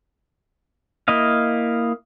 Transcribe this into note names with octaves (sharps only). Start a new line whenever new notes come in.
A#3 E4 D#5 F5